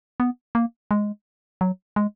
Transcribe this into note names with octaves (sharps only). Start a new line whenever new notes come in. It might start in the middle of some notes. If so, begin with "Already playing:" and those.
B3
A#3
G#3
F#3
G#3